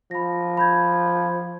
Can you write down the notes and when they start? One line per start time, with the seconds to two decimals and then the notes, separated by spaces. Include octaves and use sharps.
0.11 F3 B5 A#6
0.57 B5 G6 G#6